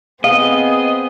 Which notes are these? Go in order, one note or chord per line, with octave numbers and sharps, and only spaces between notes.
B3 C4 G#4 D#5 F5